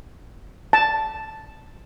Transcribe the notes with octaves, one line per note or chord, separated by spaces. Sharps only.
A5